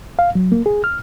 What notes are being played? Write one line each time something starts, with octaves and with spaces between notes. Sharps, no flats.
F5
F#3
A#3
G#4
F6